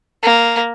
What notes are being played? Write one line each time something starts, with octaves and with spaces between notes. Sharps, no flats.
A#3